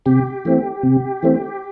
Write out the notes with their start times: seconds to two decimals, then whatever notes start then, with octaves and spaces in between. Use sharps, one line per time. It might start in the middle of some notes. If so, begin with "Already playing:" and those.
0.06 C3 G4
0.45 E3 A3 C4
0.83 C3
1.23 E3 A3 C4